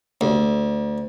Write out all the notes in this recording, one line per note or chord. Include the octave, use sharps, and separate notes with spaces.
D2